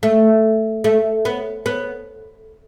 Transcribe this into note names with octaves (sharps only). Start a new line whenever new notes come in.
A3
A3
B3
B3